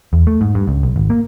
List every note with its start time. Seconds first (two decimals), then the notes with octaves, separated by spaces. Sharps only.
0.13 E2
0.27 A3
0.41 G#2
0.55 G2
0.68 C#2
0.83 B1
0.96 G#1
1.10 A#3